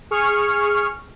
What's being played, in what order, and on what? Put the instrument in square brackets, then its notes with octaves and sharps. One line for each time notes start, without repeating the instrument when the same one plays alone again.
[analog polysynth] G#4 C#6 F6